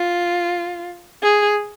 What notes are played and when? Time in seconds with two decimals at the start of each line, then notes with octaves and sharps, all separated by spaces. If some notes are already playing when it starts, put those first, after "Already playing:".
Already playing: F4
1.23 G#4